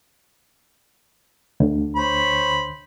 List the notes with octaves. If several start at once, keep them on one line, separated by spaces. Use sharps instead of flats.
D2 D3
C5 C#5 B5